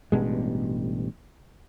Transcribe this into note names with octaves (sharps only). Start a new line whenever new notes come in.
A1 G2 B2 G#3